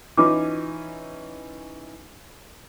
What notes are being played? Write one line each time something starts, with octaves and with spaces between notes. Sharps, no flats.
E3 C#4 D#4 F4 B4 D6